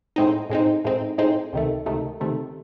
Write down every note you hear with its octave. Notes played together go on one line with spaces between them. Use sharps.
A2 G#3 C4 D#4
A2 G#3 C4 D#4
A2 G#3 C4 D#4
A2 G#3 C4 D#4
C#2 C3 D#3 A3
C#2 C3 D#3 A3
C#2 C3 D#3 A3